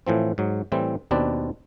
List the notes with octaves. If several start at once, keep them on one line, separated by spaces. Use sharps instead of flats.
A2 E3 F3 C4
G#2 F#3
A2 E3 G3 C4
D#2 B2 C4 D4 B4 D5